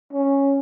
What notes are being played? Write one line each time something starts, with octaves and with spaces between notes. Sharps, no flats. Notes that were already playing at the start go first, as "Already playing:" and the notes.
C#4